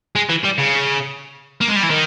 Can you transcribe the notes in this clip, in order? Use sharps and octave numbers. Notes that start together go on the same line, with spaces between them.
G#3
E3
G3
C#3
A#3
G#3
G3
E3
D#3